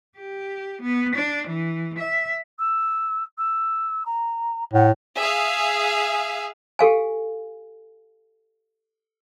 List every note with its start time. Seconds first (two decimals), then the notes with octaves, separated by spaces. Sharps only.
0.18 G4
0.82 B3
1.15 D4
1.47 E3
1.99 E5
2.59 E6
3.38 E6
4.05 A#5
4.73 A2 F#5
5.18 G#4 E5 F5
6.79 G4 A4 F5 G#5